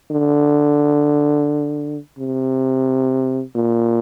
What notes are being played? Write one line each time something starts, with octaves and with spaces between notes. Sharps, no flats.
D3
C3
A#2